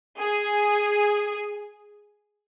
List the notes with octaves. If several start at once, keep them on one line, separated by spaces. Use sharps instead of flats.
G#4